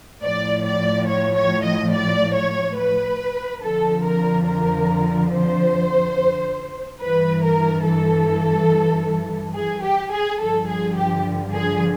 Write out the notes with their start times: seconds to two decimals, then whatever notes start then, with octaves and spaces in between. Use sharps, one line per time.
0.23 A2 F3 D5
0.65 D5
1.08 C#5
1.35 C#5
1.64 D#5
1.92 D5
2.34 C#5
2.77 B4
3.61 F2 D3 F3 A4
4.04 A#4
4.46 A#4
5.31 C5
7.00 G2 E3 B4
7.43 A#4
7.85 A4
9.56 G#4
9.83 G4
10.12 G#4
10.40 G2 D3 F3 A4
10.69 G#4
10.96 G4
11.53 G#4